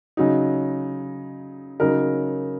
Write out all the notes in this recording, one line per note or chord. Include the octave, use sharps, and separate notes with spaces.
C#3 F#3 D#4
C#3 F#3 D#4 A#4